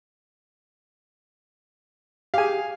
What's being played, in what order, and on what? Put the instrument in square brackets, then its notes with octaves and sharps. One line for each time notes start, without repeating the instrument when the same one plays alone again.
[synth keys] G4 G#4 [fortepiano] F5 G#5